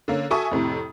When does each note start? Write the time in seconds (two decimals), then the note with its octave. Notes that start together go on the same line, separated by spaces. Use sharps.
0.08 D3 A#3 C#4
0.30 F#4 A4 E5 G#5 C#6 D#6
0.51 F2 A2 C3